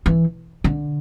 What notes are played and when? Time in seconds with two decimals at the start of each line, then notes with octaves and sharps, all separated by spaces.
0.06 E3
0.64 D3